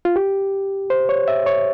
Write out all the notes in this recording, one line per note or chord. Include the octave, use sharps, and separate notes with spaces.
F4
G4
C5
C#5
E5
C#5